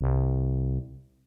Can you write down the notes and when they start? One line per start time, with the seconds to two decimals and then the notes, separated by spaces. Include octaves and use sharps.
0.01 C2